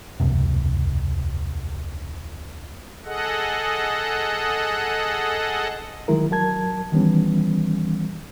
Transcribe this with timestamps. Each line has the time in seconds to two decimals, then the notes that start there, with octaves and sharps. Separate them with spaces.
0.20 E1 C#2 F#2 C3
3.05 G#4 A4 D#5 F#5
6.08 D#3 F#3 G#3 E4 A#4
6.31 F#3 A#4 A5 G#6
6.92 D#3 E3 G3 B3 C#4